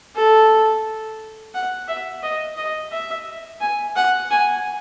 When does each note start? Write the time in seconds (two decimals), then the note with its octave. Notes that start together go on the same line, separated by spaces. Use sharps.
0.15 A4
1.54 F#5
1.88 E5
2.23 D#5
2.57 D#5
2.92 E5
3.60 G#5
3.96 F#5
4.31 G#5